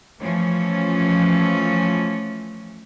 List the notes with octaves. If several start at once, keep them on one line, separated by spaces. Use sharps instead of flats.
E3 F3 A3 C#4